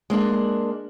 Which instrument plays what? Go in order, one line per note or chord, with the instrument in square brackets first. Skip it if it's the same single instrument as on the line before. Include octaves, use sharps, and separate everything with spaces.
[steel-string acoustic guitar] G#3 A#3 D4